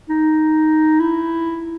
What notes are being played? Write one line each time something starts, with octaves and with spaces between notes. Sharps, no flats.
D#4
E4